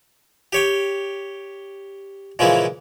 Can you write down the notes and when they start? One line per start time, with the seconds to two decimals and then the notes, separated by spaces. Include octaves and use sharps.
0.53 G4 C#5 G5
2.39 A#2 C#3 E3 F3 G#3 E4